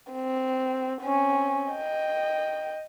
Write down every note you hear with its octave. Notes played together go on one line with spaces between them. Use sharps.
C4
C4 C#4
D#5 G5